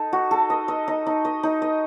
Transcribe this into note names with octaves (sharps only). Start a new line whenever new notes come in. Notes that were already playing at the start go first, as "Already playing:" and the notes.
Already playing: D#4 A4
F#4
A4
D#5
D#5
D#4
D#4
D#5
D#4
D#5